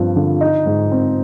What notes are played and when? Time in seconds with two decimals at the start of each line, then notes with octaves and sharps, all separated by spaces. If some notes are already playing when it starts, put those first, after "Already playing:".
Already playing: G2 F3 C4
0.16 D3
0.41 D#4
0.66 G#2
0.92 C4